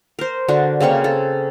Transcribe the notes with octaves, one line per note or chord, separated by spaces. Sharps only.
A#4 C5
D3 D4 F#4
C#3 A#3 C4 C#6
A4